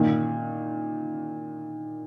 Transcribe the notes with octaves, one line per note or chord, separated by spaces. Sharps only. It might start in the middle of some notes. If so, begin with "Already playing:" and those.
Already playing: A#2 D#3